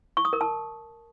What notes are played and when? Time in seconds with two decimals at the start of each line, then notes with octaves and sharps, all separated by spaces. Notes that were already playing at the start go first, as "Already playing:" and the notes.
0.17 C#6
0.25 D#6
0.33 A#4
0.41 A5